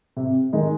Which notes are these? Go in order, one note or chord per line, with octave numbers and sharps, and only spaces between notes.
C3
D#3 G#3 D#4